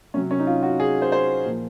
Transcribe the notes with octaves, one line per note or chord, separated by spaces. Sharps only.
C3 F#3 C#4
C#4
D#4
F4
F#4
G#4
C5
C5
A#2 F3